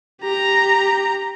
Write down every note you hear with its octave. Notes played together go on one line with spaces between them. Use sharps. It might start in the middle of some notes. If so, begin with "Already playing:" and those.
G4 A#5